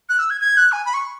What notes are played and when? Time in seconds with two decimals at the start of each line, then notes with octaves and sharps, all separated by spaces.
0.09 F#6
0.19 E6
0.30 G#6
0.41 G#6
0.57 F#6
0.72 G#5
0.85 B5
0.94 C#6